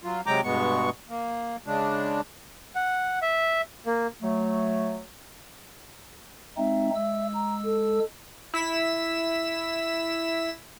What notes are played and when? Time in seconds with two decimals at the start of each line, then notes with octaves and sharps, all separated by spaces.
0.04 F#3 F4
0.26 C3 F#3 G#3 G5 A#5 D6
0.44 G2 B2 G#3 B3 C#6
1.09 A#3
1.66 C#3 G#3 D4
2.75 F#5
3.22 E5
3.86 A#3
4.21 F#3 A3
6.57 G#3 C4 D#4 E5
6.95 G#3 E6
7.34 A#5
7.65 A4
8.54 E4 B6 E7